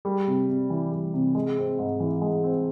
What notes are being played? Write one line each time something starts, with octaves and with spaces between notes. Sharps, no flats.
G3
C3
C3
E3
G3
C3
G#3
C4
G#2
E3
G#3
C4